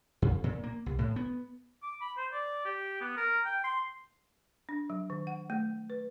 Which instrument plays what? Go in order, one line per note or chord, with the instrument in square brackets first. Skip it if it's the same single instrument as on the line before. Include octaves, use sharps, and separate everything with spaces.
[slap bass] F2
A#2
A#3
C2
A2
B3
[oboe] D6
B5
C5
D5
G4
B3
A#4
G5
C6
[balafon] D4
F#3
D#3
F#5
A3
B4